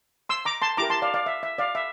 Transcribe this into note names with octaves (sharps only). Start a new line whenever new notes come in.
C6 E6
A#5 D6
A5 C6
E4 G4 A#4 A#5 D6
A5 C6
D5 F5
D5 F5
E5
E5
D5 F5
E5